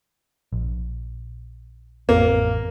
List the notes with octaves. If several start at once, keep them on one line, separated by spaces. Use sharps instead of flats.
A#1
A1 F2 A#3 C4